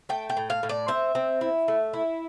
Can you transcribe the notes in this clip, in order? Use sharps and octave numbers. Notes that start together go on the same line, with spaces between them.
A3 G5
G5
A2
F5
A2
D5
C4 E5
C4
E4
A3
E4